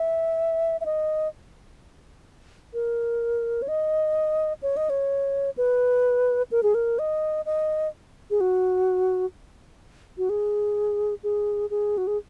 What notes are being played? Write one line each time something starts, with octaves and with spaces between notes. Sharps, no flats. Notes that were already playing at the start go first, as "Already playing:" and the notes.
Already playing: E5
E5
D#5
A#4
C#5
D#5
C#5
D#5
C#5
B4
A#4
G#4
A#4
D#5
D#5
G#4
F#4
F#4
G#4
G#4
G#4
F#4
G#4